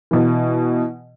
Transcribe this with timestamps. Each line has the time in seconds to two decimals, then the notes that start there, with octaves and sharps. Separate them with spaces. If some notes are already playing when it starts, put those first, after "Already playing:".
0.11 B2 E3